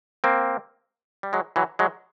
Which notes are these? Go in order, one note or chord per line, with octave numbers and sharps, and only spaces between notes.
A#3 C4
G3
F#3 G#3
E3 F#3
F#3 G#3